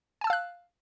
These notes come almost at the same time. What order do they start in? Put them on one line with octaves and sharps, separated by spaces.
G#5 A5 E6 F5 F#6